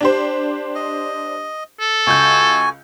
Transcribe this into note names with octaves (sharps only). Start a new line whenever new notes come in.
D4 G4 C5
D#5
A4
C#2 F#4 G#5 G6